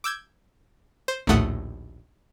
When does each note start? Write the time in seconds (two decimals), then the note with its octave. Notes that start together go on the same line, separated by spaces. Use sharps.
0.04 D6 E6 G6 G#6
1.08 C5
1.27 A#1 D#2 A2 A3 F#5 D#6